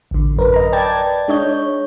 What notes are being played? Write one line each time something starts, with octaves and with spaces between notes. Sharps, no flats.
A1 D3
F#2 A#4 B4
D#5 A#5
B4 D5 G5 A5 G#6 A6
G#3 D4 D#4 C#5 D#5 G6
C#5